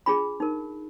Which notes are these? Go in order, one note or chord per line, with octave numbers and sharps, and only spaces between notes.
D4 F4 G#4 B5
D#4 A#4